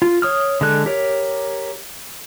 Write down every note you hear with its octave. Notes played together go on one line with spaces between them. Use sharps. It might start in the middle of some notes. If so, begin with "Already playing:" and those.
F4
C#5 D#6 F6
D3 G#3 A4 F#6
G4 A#4 C#5